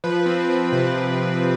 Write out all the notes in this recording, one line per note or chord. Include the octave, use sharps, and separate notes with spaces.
F3 B4
C4
F3 B4
C3 B4
C4
C4